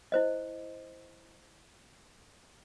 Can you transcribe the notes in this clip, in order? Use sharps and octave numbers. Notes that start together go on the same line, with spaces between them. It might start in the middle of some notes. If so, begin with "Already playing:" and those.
E4 C5 D#5